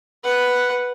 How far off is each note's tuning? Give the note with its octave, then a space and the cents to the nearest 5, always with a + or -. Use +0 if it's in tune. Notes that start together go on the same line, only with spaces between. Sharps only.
B4 +0 F#5 +0